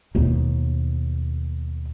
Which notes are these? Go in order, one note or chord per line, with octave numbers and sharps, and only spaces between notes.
D#2 B2